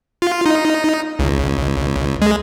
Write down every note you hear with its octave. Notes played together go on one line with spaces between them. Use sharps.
F4
D#4
C#2
G#3